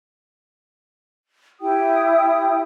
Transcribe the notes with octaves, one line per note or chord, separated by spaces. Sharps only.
E4 G4 G5 D#6